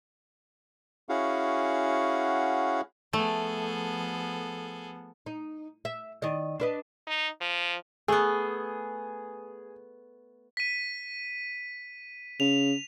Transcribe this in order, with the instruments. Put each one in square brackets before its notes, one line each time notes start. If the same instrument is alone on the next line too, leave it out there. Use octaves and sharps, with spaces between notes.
[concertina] C#4 E4 F#4 G#4 F5 F#5
[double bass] F3 B3 [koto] A3 [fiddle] G#4 A4
[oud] D#4
E5
D#3 D5 D#5
D4 B4 D#5
[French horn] D#4
F3
[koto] A3 B3 [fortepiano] G#4
[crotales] B6 D#7
[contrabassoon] C#3 [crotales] F7